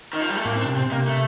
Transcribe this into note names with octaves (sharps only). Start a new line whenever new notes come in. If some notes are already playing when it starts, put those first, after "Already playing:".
D#3
F3
G3
A3
A2 A#3
C4
D4
C3
C4
C3
A#3
A3